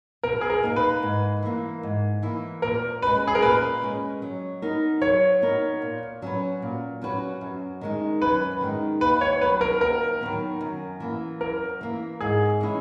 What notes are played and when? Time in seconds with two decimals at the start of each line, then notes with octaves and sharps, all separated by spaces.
0.23 B2 A#4
0.41 G#4
0.50 A#4
0.63 A#3 D#4 A#4
0.76 B4
1.02 G#2
1.43 E3 A#3 E4
1.83 G#2
2.23 E3 A#3 E4
2.62 A#2 A#4
3.02 G#3 C#4 B4
3.27 G#4
3.35 A#4
3.42 A#2 B4
3.82 G#3 C#4
4.22 F#3
4.62 B3 D#4 A#4
5.01 F#3 C#5
5.42 B3 D#4 A#4
5.82 A#2
6.22 F#3 C#4 F#4 B4
6.62 A#2
7.02 F#3 C#4 F#4 B4
7.41 F#2
7.81 D#3 G#3 D#4
8.22 F#2 B4
8.61 D#3 G#3 D#4
9.01 D#2 B4
9.21 C#5
9.41 D#3 F#3 B3 B4
9.61 A#4
9.81 D#2 A#4
10.21 D#3 F#3 B3
10.61 F#2
11.00 E3 A#3
11.41 F#2 A#4
11.81 E3 A#3
12.21 G#2 G#4
12.61 E3 G#3 C#4 E4